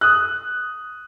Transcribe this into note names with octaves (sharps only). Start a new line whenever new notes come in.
D#6 F#6